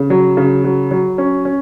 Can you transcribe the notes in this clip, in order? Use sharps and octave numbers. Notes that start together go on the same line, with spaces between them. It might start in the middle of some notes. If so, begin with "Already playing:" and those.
Already playing: C#3
F#3
C#3
F#3
F#3
C#4
C#4